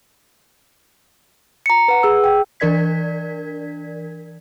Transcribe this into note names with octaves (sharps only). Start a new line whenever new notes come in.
A#5 C#7
B4 F#5
G#4 E6
G5
E3 D4 A#4 D5 G#6 B6